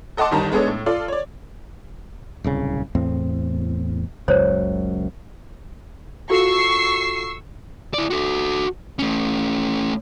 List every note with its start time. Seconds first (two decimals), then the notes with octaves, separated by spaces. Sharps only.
0.17 A4 D#5 F#5 A5 C6 D6
0.31 G1 D#3 G3 D#4 A5 A#5
0.52 G#3 B3 D4 G#4 A4 C#5
0.67 A2
0.86 F4 A4 D5
1.08 C#5 D5
2.44 D1 C2 C#3
2.95 E2 A2 C4
4.28 F#1 C#2 F#2 C5 C#5
6.30 F4 F#4 A4 C#6 E6 C7
7.94 E4 D5
8.10 F#4 A4
8.99 A3 C#4